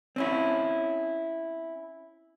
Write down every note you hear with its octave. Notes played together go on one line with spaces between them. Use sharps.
C4 C#4 E4